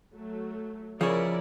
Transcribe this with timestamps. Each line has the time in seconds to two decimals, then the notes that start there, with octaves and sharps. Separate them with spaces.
0.14 F#3 A3
1.01 C#3 F3 E4 A#4 C#5 D5